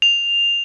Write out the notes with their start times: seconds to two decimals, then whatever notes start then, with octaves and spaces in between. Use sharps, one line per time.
0.02 F7